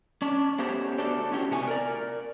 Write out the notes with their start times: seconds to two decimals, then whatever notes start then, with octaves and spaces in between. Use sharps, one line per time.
0.22 C#4 D4
0.59 A3 B3 C#4 G4 C5
0.98 D4 F#4 A4 C5 D5
1.32 C#4 E4 F#4 G4
1.51 C3 A3 B3 G#5
1.67 A#4 D5